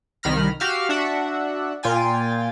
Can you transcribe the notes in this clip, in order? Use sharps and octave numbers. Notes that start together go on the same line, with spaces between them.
C2 D#3 B5 F6 A#6
F#4 G4 F5 E6 F6
D4 F#4 E5 F#5
A#2 F4 G5 G#5 A6